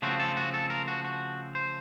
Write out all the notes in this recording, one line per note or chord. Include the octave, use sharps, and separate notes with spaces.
C#3 F3 A3 C4 F#4
A4
F#4
A4
A#4
F#4
F#4
C5